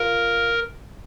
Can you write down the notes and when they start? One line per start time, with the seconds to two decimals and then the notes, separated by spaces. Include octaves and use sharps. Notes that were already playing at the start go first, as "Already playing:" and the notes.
Already playing: F4 A#4